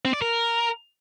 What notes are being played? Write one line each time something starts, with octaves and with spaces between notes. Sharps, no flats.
C4
D5
A#4